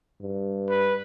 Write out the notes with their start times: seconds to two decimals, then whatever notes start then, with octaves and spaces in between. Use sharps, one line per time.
0.22 G2
0.69 B4